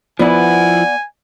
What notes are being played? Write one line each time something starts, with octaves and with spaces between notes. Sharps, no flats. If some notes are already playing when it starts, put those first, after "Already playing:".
F3 B3 E4 D5 F#5 G#5